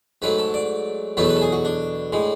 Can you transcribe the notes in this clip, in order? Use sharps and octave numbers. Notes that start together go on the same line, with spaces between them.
G#2 F#3 A3 B4
A4
D5
E2 B2 F#3 A3 B4
A4
B4
A4
G#4
F#4
D4
A2 G#3